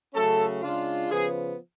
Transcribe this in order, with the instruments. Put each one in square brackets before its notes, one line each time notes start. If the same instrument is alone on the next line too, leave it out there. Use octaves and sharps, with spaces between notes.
[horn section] C#3 F#3 A3 C#4 A4
C#3 G#3 D4 F4
C#3 F3 B3 G#4